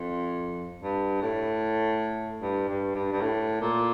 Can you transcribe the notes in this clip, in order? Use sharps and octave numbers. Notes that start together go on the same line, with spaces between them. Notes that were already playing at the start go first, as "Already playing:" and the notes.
Already playing: F2
G2
A2
G2
G2
G2
G2
A2
A#2